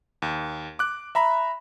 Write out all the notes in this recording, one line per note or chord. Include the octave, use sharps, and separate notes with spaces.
D#2
D6 F#6
E5 A#5 B5